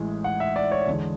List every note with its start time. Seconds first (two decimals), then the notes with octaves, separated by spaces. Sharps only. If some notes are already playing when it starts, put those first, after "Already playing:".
Already playing: A1 A2 G#3
0.24 F#5
0.40 E5
0.56 D5
0.72 C#5
0.87 E2 D3 G#3